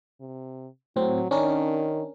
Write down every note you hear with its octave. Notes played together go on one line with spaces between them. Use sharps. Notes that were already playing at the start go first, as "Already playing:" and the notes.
C3
A2 F#3 C4
D#3 C#4 D4 A#4